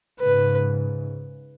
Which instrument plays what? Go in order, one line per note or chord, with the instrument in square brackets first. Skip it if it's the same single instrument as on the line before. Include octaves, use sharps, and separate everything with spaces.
[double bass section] G#2 C#3 [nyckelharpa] B4